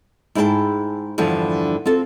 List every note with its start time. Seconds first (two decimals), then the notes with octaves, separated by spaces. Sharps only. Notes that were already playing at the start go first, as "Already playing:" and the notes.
0.35 G#2 E4 G#4 B4 G5 A5
1.18 E2 G2 D3 E3 F3
1.86 C4 F4 A4